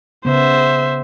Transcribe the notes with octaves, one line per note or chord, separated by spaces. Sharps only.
C#3 B3 C5 E5